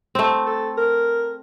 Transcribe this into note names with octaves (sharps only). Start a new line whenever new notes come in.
A3 C4
A4
A#4